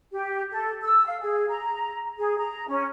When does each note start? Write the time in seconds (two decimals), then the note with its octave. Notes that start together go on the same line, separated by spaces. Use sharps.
0.12 G4
0.50 A4
0.83 E6
1.07 F5
1.21 G#4
1.48 A#5
2.18 G#4
2.37 A#5
2.68 C#4